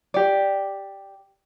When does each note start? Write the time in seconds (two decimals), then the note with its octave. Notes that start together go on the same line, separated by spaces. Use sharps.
0.14 G4 D5